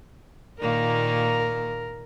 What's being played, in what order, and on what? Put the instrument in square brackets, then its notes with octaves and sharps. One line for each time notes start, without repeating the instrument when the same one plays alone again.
[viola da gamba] A#2 D#3 A#3 [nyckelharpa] A#4